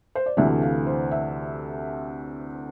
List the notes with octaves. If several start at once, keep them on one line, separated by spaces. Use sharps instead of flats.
C5
D5
D2 C3 E3 A3 E5
F5
C5
E5